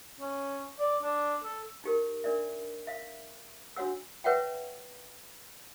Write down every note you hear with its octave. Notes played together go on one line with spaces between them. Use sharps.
C#4
D5
D4
A4
D#4 G4 A#4
D4 A#4 D5 E5
E5 F5
D4 F#4 C#5 F#5 E6
B4 C#5 E5 F#5 G5